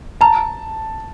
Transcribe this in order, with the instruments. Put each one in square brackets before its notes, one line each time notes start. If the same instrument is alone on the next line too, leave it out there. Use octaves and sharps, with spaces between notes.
[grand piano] A5 [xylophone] A#5